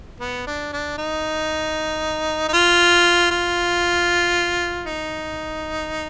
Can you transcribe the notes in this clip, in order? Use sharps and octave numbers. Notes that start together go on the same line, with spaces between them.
B3
D4
D4
D#4
D#4
F4
F4
D#4